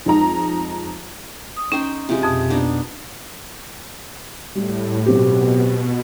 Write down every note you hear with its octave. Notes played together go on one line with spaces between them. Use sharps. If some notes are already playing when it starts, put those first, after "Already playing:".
F2 G#3 D#4 A#5
D#6
C#4 D#4 G5 C6
C3 F3 G#3
F2 B2
B3 D4 D#4
A2 G3
B2 F#3 C4 G4